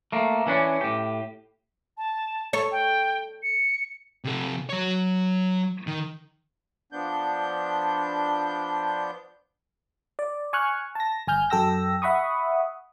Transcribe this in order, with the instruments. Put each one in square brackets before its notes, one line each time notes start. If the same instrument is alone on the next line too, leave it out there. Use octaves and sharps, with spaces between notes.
[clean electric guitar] A3 A#3
E3 C#4 D4
A2 G4
[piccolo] A5
[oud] A4 C#5
[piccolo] G5
C#7
[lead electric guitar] C3 A4
F#3 C#5
D#3
[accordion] F3 B3 D4 G6
[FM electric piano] D5
G#5 C#6 F6 F#6
A5 A#6
G1 G#5 F6 G6
F#2 A4 G5 E6 A#6
E5 F#5 B5 C#6 D#6